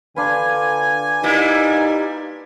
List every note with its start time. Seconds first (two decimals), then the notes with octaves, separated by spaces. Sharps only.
0.16 D3 D4 F4 B4 G#5
1.23 G3 A#3 D#4 E4